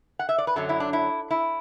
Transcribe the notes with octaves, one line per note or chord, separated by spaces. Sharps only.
F#5
E5
D5
B4
F#2 D3 F#3 A4
E4
D4
E4
E4